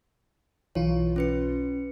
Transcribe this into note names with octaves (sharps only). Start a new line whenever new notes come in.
B1 E3 F4 C#5
C#4 B4 C#7